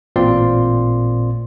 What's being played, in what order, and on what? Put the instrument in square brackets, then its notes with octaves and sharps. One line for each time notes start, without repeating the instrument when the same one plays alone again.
[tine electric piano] A1 A#2 C4 F4 D5 C6